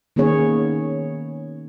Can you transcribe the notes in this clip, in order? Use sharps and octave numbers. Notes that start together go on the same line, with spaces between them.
D#3 A#3 B3 C#4 G#4 C#5